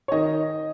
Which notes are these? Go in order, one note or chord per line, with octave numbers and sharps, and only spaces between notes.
C#5
D#3 D#5